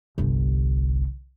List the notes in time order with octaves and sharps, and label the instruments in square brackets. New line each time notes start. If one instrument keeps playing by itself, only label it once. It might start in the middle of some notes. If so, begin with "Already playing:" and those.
[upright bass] G1 C2